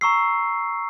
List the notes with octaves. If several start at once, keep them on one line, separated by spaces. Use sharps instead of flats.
A#5 C#6 E6 C7